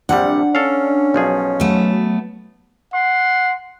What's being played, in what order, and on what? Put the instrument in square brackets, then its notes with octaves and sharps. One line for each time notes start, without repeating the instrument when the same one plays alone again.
[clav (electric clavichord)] A#1 C3 G3 [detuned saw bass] D4 [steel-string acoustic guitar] F#5
[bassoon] C#4 [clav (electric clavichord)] A4 F5
[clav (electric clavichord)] B1 F3 G#4
[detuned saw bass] F#3 [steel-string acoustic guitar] A3 B3
[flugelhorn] F#5 [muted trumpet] C6